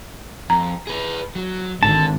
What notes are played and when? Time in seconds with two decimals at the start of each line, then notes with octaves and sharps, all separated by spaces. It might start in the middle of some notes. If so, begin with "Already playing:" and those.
0.50 F2 A#5
0.87 G#4 B4
1.35 F#3
1.83 G#1 D3 A5